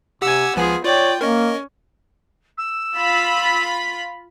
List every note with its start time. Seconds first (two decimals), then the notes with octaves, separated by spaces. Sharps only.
0.22 C3 G4 F#5 G#5 E6
0.56 C#2 F3 B3 F4 G#4 G#5
0.84 F4 C#5 D5 G5
1.21 A#3 C#4 A#4 D#5
2.57 E6
2.96 F4 B5